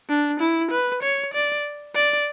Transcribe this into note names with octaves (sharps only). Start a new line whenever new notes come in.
D4
E4
B4
C#5
D5
D5